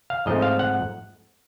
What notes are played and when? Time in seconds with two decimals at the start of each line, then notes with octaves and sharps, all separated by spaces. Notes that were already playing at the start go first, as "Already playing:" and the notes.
0.10 F5
0.26 G#2 F3 A3 C4 D#5
0.42 F5
0.59 F#5